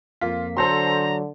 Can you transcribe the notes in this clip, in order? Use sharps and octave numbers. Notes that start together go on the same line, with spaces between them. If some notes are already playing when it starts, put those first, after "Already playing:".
F2 A#3 F4 B6
D3 F#3 A4 C5 A#5 C6